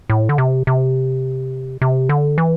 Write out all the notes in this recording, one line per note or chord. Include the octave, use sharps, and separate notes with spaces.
A2
D3
C3
C3
C3
D3
E3